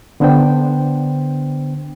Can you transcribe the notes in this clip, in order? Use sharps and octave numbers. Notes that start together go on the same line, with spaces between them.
D3 B3 D4 C5 G5